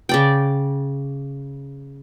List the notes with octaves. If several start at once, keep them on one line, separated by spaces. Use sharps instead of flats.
C#3 D5 G5